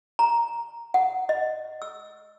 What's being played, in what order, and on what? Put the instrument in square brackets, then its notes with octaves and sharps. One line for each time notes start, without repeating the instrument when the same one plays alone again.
[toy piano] A#5
F#5
D#5
E6